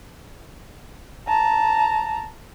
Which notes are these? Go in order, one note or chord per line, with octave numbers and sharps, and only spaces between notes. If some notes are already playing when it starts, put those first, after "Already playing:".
A5 A#5